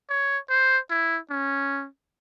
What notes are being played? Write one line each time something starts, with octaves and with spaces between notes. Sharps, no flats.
C#5
C5
E4
C#4